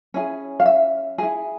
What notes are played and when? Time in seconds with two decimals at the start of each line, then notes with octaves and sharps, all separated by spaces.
0.14 C#4 E4 G#4
0.60 F5
0.66 E5
1.18 E4 G#4